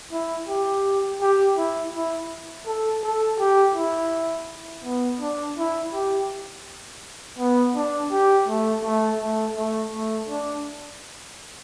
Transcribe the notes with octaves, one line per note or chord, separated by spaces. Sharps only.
E4
G4
G4
E4
E4
A4
A4
G4
E4
B3
D4
E4
G4
B3
D4
G4
A3
A3
A3
A3
A3
D4